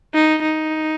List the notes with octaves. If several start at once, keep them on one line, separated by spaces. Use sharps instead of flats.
D#4
D#4